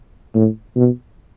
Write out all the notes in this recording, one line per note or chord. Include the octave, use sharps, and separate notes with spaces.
A2
B2